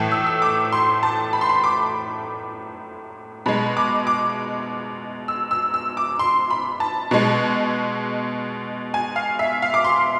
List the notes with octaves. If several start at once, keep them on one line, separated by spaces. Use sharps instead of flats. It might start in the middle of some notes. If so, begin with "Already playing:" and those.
Already playing: A2 E3 A3
E6
E6
D6
C6
A5
B5
C6
B5
D6
B2 G#3 B5
D6
D6
E6
E6
E6
D6
C6
B5
A5
B2 G#3
G#5
F5
E5
F5
D6
C6